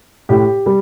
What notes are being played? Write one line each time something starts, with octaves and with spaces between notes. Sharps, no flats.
A2 G4
G3